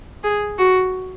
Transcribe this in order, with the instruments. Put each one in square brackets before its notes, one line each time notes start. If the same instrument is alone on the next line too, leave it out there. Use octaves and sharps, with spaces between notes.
[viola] G#4
F#4